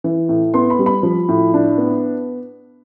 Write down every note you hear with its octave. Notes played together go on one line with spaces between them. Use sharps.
E3
A2
B3 C6
B5
G3
B5
F3
A2
D4
B3